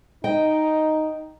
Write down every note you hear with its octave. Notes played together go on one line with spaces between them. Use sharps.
D#4 D#5 G5